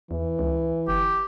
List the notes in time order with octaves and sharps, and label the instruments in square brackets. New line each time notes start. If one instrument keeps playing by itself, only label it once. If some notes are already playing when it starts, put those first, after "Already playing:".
[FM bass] E2 [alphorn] E3
[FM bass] C#2
[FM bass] G1 [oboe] G4